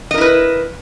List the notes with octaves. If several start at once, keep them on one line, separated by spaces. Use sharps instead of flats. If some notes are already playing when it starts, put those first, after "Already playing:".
E4 A#4 B4 D#5